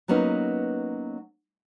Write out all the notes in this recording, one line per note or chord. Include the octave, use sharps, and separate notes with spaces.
F#3 A#3 B3 C#4 D#4